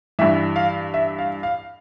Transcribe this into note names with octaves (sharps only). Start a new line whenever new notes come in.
G2 E3 E5
F5
E5
F5
F5